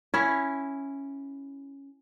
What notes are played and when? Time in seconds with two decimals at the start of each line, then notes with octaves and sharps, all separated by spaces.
0.14 C#4 E4